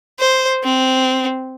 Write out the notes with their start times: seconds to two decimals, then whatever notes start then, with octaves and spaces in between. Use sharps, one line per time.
0.19 C5
0.64 C4